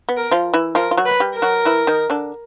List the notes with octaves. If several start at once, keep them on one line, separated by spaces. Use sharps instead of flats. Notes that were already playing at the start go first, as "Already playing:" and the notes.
B3
A#4
F3 F4
E3 E4
F3 F4 A#4
F4
F#3 F#4
B4
G3 G4
A#4
F#3 F#4
E3 E4
D#3 D#4
D3 D4